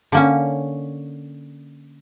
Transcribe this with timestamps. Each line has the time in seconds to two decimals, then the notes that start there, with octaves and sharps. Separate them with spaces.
0.12 D3 A#3 C#4